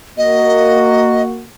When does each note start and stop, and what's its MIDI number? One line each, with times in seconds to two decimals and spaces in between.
0.18 1.43 58
0.18 1.43 66
0.18 1.22 75